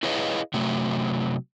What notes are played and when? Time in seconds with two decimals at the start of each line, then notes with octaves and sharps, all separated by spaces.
0.03 E4 G#4 B4 C#5 D#5 F5
0.54 C3 F#3 A3